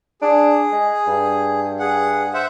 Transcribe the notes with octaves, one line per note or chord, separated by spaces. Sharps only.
D4 G#4
G#3
G2
G#4 F#5
C5 E5 F#5